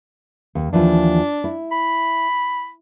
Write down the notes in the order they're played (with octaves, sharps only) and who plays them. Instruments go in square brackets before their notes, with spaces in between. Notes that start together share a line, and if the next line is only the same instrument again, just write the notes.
[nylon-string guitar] D#2
[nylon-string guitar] D#2 E3 F3 [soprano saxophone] D4
[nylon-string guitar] E4
[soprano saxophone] B5